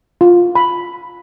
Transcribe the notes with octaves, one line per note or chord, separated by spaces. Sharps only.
F4
B5